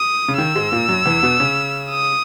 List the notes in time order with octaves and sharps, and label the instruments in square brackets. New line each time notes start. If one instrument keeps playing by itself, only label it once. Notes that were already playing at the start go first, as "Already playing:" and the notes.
Already playing: [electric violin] D#6
[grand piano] C#3
[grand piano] D#3 [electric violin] E6
[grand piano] G#2 G#3
A#2 A#3
F#2 F#3
E2 E3
B2 B3
C#3 C#4
[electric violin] D#6